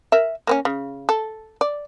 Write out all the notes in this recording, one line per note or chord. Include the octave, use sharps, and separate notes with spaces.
A#4 E5
A#3 C4 C#4
C#3
A4
D5